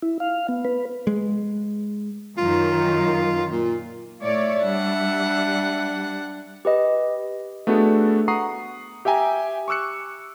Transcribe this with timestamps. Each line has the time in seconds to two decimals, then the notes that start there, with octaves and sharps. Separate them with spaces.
0.02 E4
0.20 F5
0.48 B3
0.65 B4
1.07 G#3
2.38 F#2 D#3 F4
3.51 A#2
4.22 A2 C#5 D5 E5
4.62 G3 D4 F#5
6.65 G4 B4 D#5
7.67 A3 B3 D4 F#4 G#4 A4
8.28 F#5 A#5 C#6 D#6 C7
9.05 G4 E5 G5 G#5 A#5
9.68 C#6 D6 E6 F#6 C#7